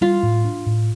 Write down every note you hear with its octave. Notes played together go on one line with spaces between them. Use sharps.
G3 F4
A2
D4
A2